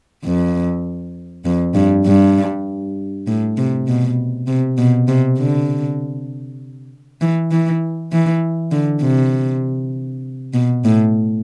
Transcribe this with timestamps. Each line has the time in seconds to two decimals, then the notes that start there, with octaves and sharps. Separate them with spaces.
0.24 F2
1.45 F2
1.75 G2
2.06 G2
3.27 A2
3.57 C3
3.88 B2
4.47 C3
4.78 B2
5.08 C3
5.38 D3
7.21 E3
7.51 E3
8.12 E3
8.72 D3
9.02 C3
10.54 B2
10.85 A2